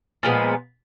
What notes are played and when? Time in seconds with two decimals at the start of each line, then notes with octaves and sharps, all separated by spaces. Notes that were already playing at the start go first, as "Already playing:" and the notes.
0.23 A#2 F3 G#3 B3